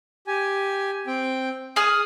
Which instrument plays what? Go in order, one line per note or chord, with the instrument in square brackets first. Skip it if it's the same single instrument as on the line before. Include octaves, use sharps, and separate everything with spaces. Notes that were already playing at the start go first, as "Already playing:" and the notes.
[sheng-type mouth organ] G4 G#5
C4 G5
[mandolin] G#4 F6 [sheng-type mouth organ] D#6